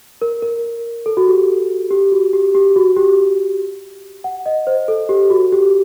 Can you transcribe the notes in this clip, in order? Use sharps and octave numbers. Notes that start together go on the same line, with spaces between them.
A#4
A#4
A4
F#4
G4
G4
F#4
G4
G4
F#4
G4
F#5
D#5
C5
A4
G4
F#4
G4